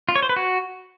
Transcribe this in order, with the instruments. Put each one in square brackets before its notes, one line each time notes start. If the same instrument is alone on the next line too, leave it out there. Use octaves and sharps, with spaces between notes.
[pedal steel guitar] F4
C#5
C5
B4
F#4